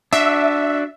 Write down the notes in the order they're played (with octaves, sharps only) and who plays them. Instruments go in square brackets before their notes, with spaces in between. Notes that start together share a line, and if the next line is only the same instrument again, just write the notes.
[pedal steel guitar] D4 F#4 [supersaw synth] E5